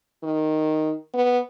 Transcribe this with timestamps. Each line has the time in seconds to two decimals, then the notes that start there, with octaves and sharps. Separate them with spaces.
0.23 D#3
1.14 B3